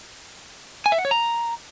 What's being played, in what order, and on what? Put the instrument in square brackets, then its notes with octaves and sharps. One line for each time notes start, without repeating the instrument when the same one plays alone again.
[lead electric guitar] G#5
E5
F#5
C#5
A#5